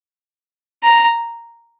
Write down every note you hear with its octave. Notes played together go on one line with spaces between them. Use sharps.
A#5